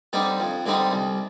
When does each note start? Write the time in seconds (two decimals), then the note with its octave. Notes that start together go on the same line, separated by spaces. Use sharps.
0.13 D3 G3 C4 D#4
0.40 F2
0.66 D3 G3 C4 D#4
0.92 C2